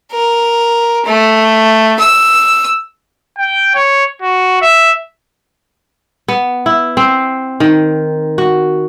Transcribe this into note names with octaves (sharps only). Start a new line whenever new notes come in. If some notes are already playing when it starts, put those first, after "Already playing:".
A#4
A3
E6
G5
C#5
F#4
E5
B3
E4
C4
D#3
F#4